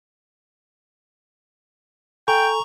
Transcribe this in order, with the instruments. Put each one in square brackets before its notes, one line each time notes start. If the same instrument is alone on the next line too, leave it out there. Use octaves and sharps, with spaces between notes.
[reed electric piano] A4 G#5 [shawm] G5 [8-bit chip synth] A#5 C#6